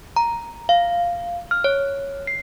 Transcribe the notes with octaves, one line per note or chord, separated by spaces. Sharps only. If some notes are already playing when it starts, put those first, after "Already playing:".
A#5
F5
F6
C#5
C7